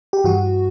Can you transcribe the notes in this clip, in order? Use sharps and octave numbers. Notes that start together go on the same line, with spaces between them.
G4
G2 E3 F#4